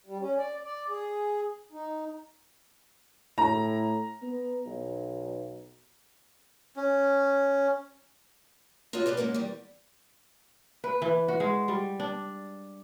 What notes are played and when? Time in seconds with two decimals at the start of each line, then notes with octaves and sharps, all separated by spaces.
0.06 G3
0.19 C#4
0.38 D5
0.64 D5
0.89 G#4
1.72 D#4
3.38 A2 A#5
4.22 B3
4.66 B1
6.76 C#4
8.93 F4 F#4 A4 C#5 D#5
9.06 G4 B4 D5 E5 F5
9.17 G#2 F#3 A#3 C#4
9.34 E2 G3
10.84 B4
11.02 E3
11.28 F#4
11.40 G#3
11.68 G3
12.00 D4